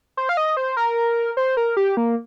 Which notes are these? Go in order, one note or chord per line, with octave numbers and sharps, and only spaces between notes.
C5
F5
D#5
C5
A#4
C5
A#4
G4
A#3